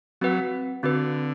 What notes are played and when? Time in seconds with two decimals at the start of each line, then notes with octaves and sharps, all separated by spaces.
0.21 F#3 C4 F#4 B4 F#5
0.83 D3 C4 F#4 B4